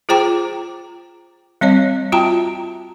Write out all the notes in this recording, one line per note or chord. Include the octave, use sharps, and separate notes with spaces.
F4 G#4 C5 G5 A#5 D6
G3 C4 C#5 D#5
F4 F#4 E5 G5 A5 A#5